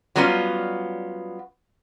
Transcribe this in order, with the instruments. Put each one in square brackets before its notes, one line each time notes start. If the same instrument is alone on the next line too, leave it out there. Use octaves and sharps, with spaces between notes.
[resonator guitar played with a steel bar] F#3 G3 B3 C#4 F4